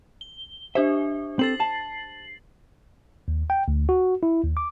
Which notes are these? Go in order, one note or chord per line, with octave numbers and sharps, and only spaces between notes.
G7
D4 G4 C5 E5
C4 A4 A6 C7 F#7
A5
D#2
G5
D2
F#4
E4
D#2
D6